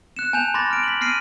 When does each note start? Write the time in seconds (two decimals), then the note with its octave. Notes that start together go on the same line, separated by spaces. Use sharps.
0.17 F#6 C#7 E7
0.33 G#5 A5 G6 E7 F7
0.54 B5 C6 D6 G6 A6 A#6
0.70 F6 D7
0.83 B6 F#7
1.01 F6 A#6 C7 D7 D#7